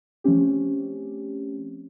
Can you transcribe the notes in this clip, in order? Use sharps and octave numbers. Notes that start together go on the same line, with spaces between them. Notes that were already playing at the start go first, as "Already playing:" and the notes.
F3 A3 C4 C#4 G4